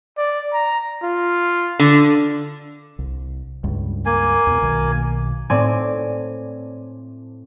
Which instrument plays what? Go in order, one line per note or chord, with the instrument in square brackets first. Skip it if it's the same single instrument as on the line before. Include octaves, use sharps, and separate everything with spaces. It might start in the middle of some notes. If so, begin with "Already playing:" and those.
[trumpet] D5
A#5
F4
[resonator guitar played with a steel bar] D3
[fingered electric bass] C2
C#2 G2
[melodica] A#3 G#5
[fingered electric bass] E2 B2
B1 B2 D#3
[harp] A2 C4 D5 G#5 D#7